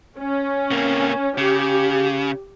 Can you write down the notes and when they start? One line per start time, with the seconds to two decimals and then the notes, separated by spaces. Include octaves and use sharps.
0.19 C#4
0.71 C3 A#3
1.38 C#3 G4